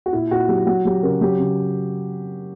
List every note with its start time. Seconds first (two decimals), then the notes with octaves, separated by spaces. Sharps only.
0.06 F#4
0.13 A#2 E4
0.31 A#2 F#4
0.49 F#3 G4
0.67 F#3 F#4
0.85 F#3 G4
1.03 C#3 A#4
1.21 F#3 G4
1.39 C#3